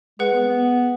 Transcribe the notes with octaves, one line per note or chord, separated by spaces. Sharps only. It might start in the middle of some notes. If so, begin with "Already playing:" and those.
G#3 G#4 B4 F#5
B3
B3